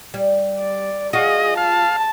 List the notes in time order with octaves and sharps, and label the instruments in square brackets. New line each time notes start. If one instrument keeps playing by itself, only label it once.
[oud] G3
[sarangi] D5
[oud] F4 F#4 [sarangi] G#4 [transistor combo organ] D#5
[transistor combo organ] F5 [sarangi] A5